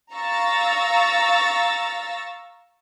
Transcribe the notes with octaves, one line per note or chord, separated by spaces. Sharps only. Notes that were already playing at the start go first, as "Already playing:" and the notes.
F5 A#5 C#6 E6 A6 A#6